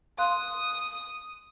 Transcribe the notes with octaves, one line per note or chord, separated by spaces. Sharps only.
F5 C6 D#6 F#6